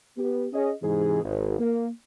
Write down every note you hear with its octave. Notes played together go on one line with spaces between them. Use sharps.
B3 G4
C#4 G#4 D#5
G#2 C3 E3 G#4
G#1
A#3